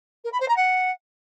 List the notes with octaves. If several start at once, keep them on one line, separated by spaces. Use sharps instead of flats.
A#4
B5
C5
A#5
F#5